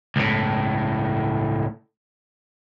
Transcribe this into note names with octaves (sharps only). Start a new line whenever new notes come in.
C#2 A2